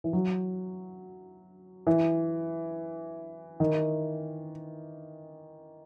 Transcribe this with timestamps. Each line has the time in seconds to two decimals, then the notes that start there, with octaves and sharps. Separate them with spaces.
0.04 E3
0.13 F#3
1.87 E3
3.60 D#3